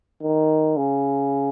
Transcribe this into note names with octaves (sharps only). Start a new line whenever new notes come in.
D#3
C#3